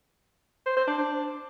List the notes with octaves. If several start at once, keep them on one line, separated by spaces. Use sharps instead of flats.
C5
C5
D4
D4